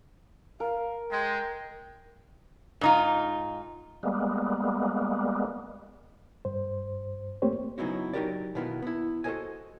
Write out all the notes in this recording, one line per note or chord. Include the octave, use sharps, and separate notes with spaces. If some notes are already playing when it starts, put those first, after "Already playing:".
A#4 F5
G#3 G5 C6
G#2 D#4 F4
G3 G#3 A#3 B3
G2 C5
A3 A#3 C4 G4 C5 C#5
C#3 F#3 B3 D#4 E4 F#4
F#3 D#4 F#4 G4 A#4 D5
B2 D#3 B3 E4 F4
B3 E4
F#4 A4 A#4 C5 D#5 G#5